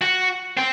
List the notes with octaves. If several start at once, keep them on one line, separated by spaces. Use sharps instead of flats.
F#4
C4